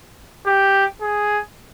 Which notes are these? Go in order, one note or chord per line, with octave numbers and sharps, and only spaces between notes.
G4
G#4